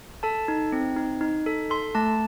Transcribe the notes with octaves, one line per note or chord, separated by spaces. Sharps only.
A4 A5
D#4
C4
D#4
D#4
A4
A4 C6
A3 A5